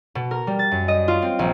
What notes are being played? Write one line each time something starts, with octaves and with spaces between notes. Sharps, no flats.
B2
A#4
G3
A6
F#2
D#5
F4
C4
A#1